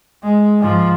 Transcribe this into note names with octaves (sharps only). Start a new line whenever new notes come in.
G#3
G#2 F3